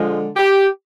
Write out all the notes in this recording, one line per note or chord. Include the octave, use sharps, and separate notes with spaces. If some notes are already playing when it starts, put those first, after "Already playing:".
Already playing: D3 F3 G#3
G4